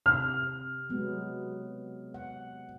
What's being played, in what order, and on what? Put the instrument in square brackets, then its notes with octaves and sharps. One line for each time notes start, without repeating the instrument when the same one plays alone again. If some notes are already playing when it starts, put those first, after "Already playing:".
[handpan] C3 [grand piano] F6
[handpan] F#3 G#3 B3
F#5